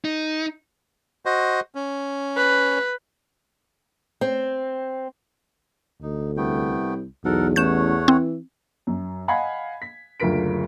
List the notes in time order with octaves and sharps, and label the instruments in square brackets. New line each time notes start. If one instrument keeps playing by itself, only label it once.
[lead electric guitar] D#4
[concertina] F#4 C5 D#5
C#4
[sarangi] B4
[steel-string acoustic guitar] C4
[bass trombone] D2 [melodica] D#4
[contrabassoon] C2 [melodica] A3 B3 G5
[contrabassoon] B1 [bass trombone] E2 [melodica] A4 A#4 F#5
[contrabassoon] A1 [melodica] A3 C#5 F#5 [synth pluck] G6 E7
[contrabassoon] E3 [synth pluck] C4
[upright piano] F#2
D#5 F5 F#5 G#5 B5 G#6
B6
F#1 D2 F4 A#4 B6 D7